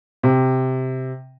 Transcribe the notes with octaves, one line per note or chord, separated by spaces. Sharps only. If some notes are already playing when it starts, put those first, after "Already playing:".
C3